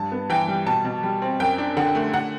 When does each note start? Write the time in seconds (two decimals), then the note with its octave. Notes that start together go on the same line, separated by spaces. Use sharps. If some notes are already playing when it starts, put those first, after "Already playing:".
Already playing: G2 A5
0.12 B3
0.30 E3 G5
0.48 G3
0.67 B2 A5
0.85 B2
1.03 G3
1.22 C4
1.40 F#2 G5
1.58 D4
1.77 D3 F#5
1.95 A3
2.14 D3 F#5